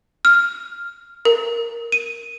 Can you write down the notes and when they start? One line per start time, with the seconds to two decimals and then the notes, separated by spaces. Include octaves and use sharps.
0.25 F6
1.25 A#4
1.92 D#7